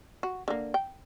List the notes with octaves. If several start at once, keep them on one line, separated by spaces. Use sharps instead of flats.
F#4
D3 A#3
G5